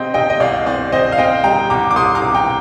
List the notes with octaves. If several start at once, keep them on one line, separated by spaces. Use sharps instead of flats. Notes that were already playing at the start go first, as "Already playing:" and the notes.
Already playing: C3 C4 D#5 G5
C3 D#5 G5
D#5
C2 D5 F5
C4 D5
C4 C5 D#5
F5
C4 D#5 G5
G3 G5 A#5
C2 A#5 D6
D6
C2 C6 D#6
A#5 D6
C3
G5 A#5